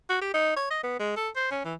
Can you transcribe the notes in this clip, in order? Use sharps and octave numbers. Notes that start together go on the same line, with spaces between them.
F#4
G4
D#4
C#5
D#5
B3
G#3
A4
C5
C#4
E3